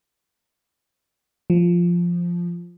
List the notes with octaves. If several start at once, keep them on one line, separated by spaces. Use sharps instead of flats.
F3